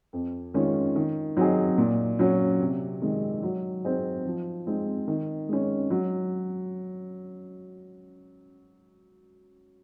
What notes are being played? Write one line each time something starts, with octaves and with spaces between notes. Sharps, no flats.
F2
D#3 G#3 C#4 F4
D#3
F#3 C4 D#4 G#4
A#2
F#3 C#4
C3
D#3 G#3
F#3
C4 D#4 G#4 C5
F3
G#3 C4 D#4
D#3
G#3 C#4
F#3